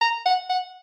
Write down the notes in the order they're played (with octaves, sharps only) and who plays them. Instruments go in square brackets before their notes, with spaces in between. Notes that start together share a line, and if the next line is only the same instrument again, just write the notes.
[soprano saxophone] A#5
F#5
F#5